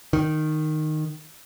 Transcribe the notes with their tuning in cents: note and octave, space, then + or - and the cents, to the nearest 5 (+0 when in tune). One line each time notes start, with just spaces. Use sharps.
D#3 -10